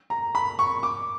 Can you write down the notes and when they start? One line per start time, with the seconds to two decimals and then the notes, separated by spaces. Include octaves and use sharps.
0.10 A#5
0.35 B5
0.59 C#6
0.83 D6